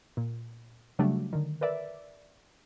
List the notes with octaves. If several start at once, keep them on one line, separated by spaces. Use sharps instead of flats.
A#2
C#3 F#3 G3 A3 D4
D3 D#3
A#4 B4 D5 E5